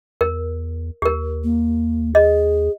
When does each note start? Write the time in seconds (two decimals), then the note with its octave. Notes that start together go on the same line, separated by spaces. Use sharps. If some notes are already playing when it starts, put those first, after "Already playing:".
0.21 E2 A#4
1.02 D#2 G4 A#4
1.44 A#3
2.15 G#4 D#5